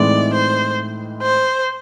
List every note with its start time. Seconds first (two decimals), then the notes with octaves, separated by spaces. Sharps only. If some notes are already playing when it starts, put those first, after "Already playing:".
Already playing: A2 E3 G#3 C4 D#4 D5
0.34 C5
1.22 C5